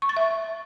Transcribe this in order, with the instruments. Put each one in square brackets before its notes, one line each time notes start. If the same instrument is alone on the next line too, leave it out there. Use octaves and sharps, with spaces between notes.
[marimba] C#6
A6
E5